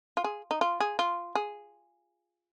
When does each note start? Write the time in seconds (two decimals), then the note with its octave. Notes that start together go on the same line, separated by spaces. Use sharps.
0.17 F4
0.24 G#4
0.51 D#4
0.61 F4
0.80 G#4
0.99 F4
1.35 G#4